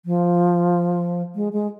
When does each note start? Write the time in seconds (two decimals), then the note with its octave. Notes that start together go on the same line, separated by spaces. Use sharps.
0.06 F3
1.35 G#3
1.53 G#3